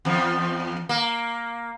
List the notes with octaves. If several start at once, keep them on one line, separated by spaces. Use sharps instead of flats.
E2 F3
A#3